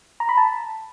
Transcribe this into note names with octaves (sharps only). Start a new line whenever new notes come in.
A#5
B5
A5